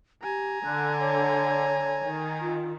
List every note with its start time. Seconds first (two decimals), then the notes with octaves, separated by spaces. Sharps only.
0.22 G4 G#5 A#5
0.64 D3 F#6
1.00 C#5
2.02 D#3
2.40 F4